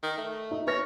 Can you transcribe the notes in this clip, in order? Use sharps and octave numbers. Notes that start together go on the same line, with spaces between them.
D#3
A3
D#4
B4 C#5 F6 A#6